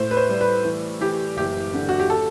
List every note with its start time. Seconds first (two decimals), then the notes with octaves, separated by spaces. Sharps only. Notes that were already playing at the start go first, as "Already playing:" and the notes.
Already playing: A2 C5
0.11 B4
0.17 C5
0.29 G3
0.41 B4
0.65 E3
1.01 E3 G4
1.37 F#1 G4
1.74 D3
1.89 F#4
2.00 G4
2.10 A4